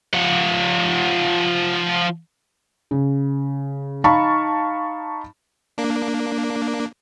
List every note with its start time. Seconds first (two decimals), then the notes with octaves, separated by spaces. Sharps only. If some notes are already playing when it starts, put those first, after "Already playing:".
0.14 F3 F#5
2.91 C#3
4.04 D#4 F5 A5 B5 C#6
5.78 A#3 D4